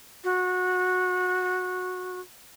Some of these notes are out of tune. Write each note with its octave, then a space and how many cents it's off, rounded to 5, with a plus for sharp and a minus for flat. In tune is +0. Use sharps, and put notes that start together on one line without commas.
F#4 -20